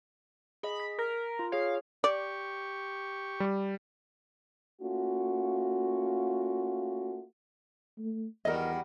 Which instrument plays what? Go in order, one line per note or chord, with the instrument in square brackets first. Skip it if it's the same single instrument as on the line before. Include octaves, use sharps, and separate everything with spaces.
[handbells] G#4 D#5 [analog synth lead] B5
[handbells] B6
[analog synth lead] A#4
[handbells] F4
[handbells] G#4 C#5 [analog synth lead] F5
[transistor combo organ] G4 C#6 [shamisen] D5
[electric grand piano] G3
[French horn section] A3 A#3 C#4 F4 F#4
[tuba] A3
[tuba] E2 [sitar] D#3 G3 F#4 [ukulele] A#4 D#5